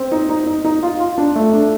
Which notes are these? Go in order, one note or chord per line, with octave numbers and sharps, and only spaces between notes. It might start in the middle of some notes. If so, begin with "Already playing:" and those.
Already playing: C4
D#4
D#4
D#4
D#4
F4
F4
D4
A3
D4